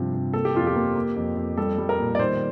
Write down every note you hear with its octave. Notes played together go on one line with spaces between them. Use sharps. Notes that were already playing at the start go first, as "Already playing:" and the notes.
Already playing: G2 C3 F3
C3
A#3 A4
G4
F2 F4
G4
A#3
A#3
F2
F2
G3 A4
G3
A#4
A#2
D5
D#3 C5